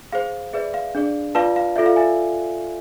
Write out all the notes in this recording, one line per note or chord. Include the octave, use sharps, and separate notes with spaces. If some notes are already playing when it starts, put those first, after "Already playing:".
G#4 C5 F5
G#4 B4 D5 E5
F5
D4 G#4 D5
F4 B4 D5 F5 A5
F5
F4 A4 D5 E5
F5
E5 G#5